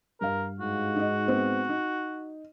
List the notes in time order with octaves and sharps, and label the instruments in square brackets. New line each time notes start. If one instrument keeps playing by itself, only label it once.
[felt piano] G2 F5 [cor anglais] A#4
[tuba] G#2 [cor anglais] F#4
[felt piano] D#4 D#5
B3 C4
D#4